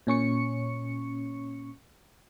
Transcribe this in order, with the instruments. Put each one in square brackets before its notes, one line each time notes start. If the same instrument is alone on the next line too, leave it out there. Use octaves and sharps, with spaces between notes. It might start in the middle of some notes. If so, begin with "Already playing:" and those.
[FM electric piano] A#2 C#4 C#6 C#7